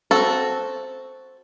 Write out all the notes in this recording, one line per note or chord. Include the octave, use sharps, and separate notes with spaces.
C4 F#4 A4